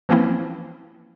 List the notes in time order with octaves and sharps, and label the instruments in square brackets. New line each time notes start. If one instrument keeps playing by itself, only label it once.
[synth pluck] E3 F3 A#3 C4 C#4 E4